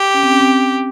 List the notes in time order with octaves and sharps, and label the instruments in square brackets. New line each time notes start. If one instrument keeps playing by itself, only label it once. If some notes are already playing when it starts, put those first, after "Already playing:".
Already playing: [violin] G4
[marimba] C#4
C4
C#4
C4